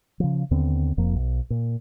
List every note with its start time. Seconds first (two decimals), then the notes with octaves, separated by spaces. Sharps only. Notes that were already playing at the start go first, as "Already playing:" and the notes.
0.20 C#3 F3
0.51 D#2 D3 B3 C4
0.97 F1 F2 F3 A#3
1.15 B1
1.50 A#2